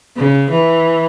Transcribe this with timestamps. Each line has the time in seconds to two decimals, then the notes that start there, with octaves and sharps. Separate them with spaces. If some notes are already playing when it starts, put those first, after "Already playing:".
0.16 C#3
0.50 E3